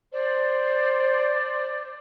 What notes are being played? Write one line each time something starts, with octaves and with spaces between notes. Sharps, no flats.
C5 D5